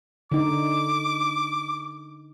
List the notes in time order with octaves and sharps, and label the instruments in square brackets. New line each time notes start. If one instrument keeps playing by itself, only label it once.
[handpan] D3 D#4 [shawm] D6